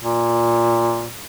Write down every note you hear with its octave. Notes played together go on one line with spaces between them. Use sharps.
A#2